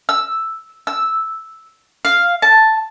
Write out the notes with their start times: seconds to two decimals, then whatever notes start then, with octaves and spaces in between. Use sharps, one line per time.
0.09 E6
0.87 E6
2.05 F5
2.42 A5